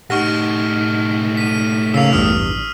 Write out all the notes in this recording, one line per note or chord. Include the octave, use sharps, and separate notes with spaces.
A2 D#4 G4 F#5 C#6 F6 A#6
B6 D#7
C#3 A#3 E6 C7 F7
A1 E2 G2 D#6 F6